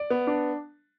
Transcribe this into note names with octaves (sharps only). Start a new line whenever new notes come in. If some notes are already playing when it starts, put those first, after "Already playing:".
Already playing: D5
B3
D4